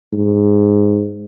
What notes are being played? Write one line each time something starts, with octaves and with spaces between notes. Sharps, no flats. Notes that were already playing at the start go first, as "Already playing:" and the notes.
G#2